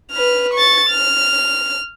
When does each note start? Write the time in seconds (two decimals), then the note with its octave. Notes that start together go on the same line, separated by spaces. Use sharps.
0.11 B4 F6
0.54 C#6 A6
0.90 F6